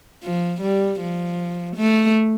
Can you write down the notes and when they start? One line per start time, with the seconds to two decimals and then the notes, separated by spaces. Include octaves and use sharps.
0.23 F3
0.61 G3
1.00 F3
1.76 A3